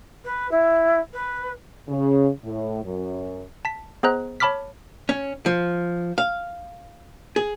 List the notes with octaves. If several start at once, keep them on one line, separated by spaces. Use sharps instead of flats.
B4
E4
B4
C#3
A2
F#2
A5 B6
B3 G#4 C5 D#5 A#5 F#6
C#5 A5 B5 D6 F6 B6
C#4
F3
F5
G#4